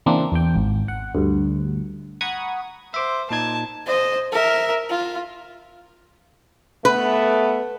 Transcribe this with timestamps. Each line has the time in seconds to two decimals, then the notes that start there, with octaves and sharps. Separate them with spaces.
0.06 C#3 E3 A#3 C4 D4
0.32 E2 G5
0.56 G#1
0.88 F#5
1.15 D2 G2
2.21 F#5 A#5 B5 C#6 D#6 G#6
2.94 C5 E5 D6
3.31 A#2 D#4 A5 G#6
3.86 C5 D#5
4.32 A#4 E5
4.89 F4
6.85 A3 B3 B4